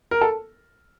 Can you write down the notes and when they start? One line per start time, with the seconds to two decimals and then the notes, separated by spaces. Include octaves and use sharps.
0.11 A#4
0.21 A4